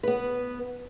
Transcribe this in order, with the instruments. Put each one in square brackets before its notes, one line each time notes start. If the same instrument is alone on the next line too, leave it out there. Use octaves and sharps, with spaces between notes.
[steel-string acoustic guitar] B3 B4